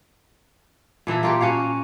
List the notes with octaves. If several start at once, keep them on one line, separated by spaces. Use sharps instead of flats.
A#2 E3 E4 A4
A#3 F4 G4
C#4 F#4 C#5 F5